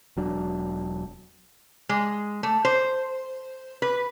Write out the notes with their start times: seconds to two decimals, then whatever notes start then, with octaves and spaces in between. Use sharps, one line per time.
0.17 E1 F#3 D4
1.89 G#3
2.43 A3
2.65 C5
3.82 B4